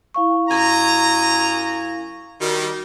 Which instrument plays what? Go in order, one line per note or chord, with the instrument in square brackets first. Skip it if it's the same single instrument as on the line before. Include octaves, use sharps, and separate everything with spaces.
[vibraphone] E4 F5 C#6
[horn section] F#2 G#5 A#5
[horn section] D#3 G3 [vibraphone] F#4